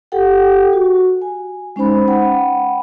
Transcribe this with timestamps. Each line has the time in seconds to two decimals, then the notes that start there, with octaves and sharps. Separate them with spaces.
0.12 G4 A4 F#5 G5
0.73 F#4
1.22 G#5
1.76 G#3 C#4 D#4 C5 B5
2.08 F#5 G5 B5